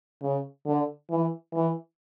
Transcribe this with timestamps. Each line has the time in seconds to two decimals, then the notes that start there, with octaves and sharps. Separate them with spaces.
0.22 C#3
0.66 D3
1.10 E3
1.53 E3